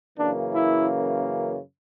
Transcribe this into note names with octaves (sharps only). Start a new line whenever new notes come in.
F#2 C#3 E3 A#3 D4
E4